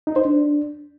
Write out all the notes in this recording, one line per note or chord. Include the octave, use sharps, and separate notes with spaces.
D#4
C5
D4